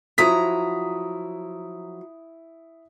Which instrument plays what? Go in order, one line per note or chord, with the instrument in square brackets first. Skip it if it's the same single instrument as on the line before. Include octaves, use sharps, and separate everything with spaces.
[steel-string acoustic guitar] F3 F#3 A#5 [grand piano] E4 D#6 B6